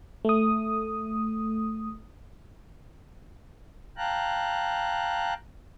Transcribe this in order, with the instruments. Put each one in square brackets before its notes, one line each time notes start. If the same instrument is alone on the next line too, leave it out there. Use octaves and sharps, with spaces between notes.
[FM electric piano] A3 D#6
[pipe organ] F5 G5 A5 A#5 F#6